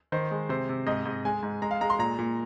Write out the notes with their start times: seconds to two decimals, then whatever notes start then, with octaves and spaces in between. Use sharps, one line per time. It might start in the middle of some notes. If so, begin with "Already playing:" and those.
0.12 D#3 C5
0.31 G#3
0.49 C3 C5
0.69 C3
0.87 G#2 D#5
1.06 G#2
1.25 G#3 G#5
1.43 G#2
1.62 G#3 A#5
1.71 F5
1.81 G#3 A#5
1.90 C6
1.99 A#2 A#5
2.19 A#2